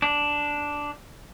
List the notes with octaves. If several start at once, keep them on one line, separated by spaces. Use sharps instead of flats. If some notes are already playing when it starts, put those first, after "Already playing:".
D4